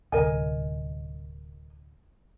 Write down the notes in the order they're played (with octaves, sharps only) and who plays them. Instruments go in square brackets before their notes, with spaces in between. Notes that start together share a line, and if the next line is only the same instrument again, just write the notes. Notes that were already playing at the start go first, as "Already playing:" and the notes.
[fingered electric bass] D1 C2 D3 [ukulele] A#4 D#5 G#5